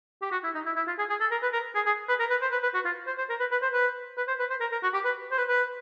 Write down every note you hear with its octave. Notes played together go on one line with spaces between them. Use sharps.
G4
F#4
E4
D#4
E4
E4
F4
G#4
G#4
A4
A#4
B4
A#4
G#4
G#4
B4
A#4
B4
C5
B4
B4
F#4
F4
C5
C5
A#4
B4
B4
C5
B4
B4
C5
B4
C5
A#4
A#4
F#4
G4
B4
C5
B4
B4